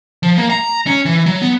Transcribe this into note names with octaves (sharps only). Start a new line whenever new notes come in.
F3
A#3
A#5
C#4
E3
F#3
B3